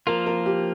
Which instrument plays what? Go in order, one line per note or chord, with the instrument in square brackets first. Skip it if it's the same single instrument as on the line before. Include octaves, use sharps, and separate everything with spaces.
[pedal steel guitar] F3 A#3 F4 [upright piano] A#4
[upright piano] A#4
G4